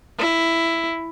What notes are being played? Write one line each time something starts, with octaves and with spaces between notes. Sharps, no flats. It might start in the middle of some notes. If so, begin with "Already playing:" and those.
E4